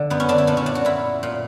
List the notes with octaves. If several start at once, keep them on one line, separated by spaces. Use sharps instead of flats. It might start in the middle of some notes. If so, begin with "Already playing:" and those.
Already playing: D3
F#2 B3
C#4
D3 D4
E4
A#2 D4
C#4
D4
F#4
A#2 E4
A#2